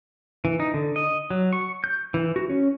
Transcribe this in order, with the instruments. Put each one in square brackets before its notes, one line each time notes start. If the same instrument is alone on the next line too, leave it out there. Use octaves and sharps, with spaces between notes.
[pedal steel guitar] E3
D#4
D3
D#5
F#3
C#6
G6
E3
F#4
C#4